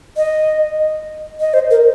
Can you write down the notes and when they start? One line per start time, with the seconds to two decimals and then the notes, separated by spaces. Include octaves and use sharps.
0.17 D#5
1.40 D#5
1.54 C5
1.71 A#4